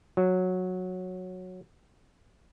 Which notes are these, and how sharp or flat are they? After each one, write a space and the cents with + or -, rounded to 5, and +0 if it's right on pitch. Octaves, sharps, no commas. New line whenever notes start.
F#3 -10